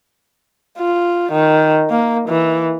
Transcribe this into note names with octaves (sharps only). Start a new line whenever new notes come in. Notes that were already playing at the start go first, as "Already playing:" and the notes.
F4
D#3
A#3
E3